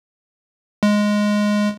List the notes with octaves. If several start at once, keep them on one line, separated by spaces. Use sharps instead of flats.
G#3